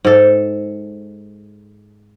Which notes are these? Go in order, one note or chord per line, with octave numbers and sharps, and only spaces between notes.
G#2 A4